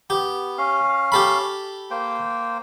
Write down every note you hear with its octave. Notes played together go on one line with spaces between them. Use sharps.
B3 G4
C#4 F5
G4 A4 B5
A#3 C5 G5